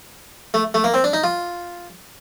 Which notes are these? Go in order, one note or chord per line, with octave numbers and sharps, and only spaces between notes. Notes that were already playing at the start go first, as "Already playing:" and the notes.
A3
A3
A#3
C4
D4
D#4
F4